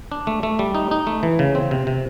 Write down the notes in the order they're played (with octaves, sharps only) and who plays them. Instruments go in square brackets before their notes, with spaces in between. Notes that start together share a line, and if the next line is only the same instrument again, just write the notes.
[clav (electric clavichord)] D4
A3
A3
G3
D#4
D#4
A3
E3
C#3
C4
C3
C3